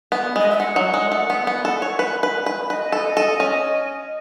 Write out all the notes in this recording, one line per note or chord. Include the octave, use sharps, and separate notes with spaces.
B3
G#3 D#5
E5
G#3 F#5
F#3
G#3
A3
B3
B3
A4
C#5
B4
B4
B4
B4 D#5
A4
A4
C#4